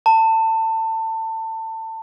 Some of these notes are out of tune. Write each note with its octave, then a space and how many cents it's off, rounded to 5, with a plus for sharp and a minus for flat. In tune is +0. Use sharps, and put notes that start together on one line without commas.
A5 +25